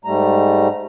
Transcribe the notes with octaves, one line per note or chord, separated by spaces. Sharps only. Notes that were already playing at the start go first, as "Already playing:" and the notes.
G#2 G3 A3 A#5